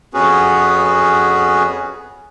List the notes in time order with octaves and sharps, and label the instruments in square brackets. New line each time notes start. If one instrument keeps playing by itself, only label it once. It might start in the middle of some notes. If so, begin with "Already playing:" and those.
[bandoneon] F2 B3 C#4 F#4 G#4 B4